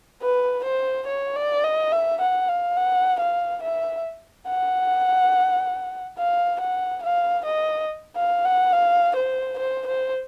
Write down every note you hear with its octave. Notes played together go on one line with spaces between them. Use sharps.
B4
C5
C#5
D5
D#5
E5
F#5
F5
F#5
F5
E5
F#5
F5
F#5
F5
D#5
F5
F#5
F5
C5
C5
C5